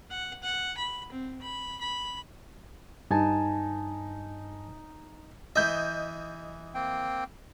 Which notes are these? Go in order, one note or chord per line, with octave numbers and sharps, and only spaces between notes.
F#5
F#5
B5
C4
B5
B5
G2 D#4 G#5 A5
E3 D#5 E5 G6
A#3 C4 G5